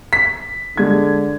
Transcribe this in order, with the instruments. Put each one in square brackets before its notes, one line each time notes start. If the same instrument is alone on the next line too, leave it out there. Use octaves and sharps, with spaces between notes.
[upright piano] B6
[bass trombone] D3 [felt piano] G#3 G#6